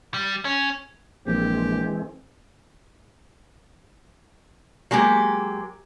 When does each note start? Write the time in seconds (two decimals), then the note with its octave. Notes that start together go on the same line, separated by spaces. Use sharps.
0.14 G3
0.45 C#4
1.27 A#1 E3 G#3 C4 G4
4.91 F#3 G#3 A#3 G4